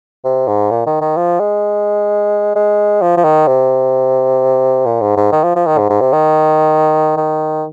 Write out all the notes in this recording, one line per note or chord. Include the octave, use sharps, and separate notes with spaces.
C3
G#2
A#2
D#3
D#3
F3
G#3
G#3
F3
F3
D#3
C3
A#2
G#2
G#2
D#3
F3
F3
D#3
G#2
G#2
C3
D#3
D#3